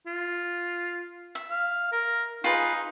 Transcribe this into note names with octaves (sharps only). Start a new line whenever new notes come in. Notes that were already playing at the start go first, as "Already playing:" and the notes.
F4
E5
F5
A#4
D#4 F4 G#4 B4